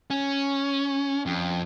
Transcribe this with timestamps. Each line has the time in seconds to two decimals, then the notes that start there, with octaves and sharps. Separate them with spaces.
0.10 C#4
1.26 F2